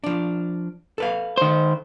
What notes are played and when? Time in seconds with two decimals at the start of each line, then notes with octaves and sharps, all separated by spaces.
0.04 F3 D4
0.98 A4 B4 F5
1.37 D#3 C5